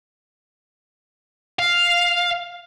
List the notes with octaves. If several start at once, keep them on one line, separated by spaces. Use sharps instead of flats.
F5